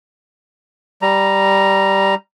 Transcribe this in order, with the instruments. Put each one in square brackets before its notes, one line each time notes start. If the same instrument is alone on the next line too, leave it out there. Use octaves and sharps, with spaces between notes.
[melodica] G3 A#5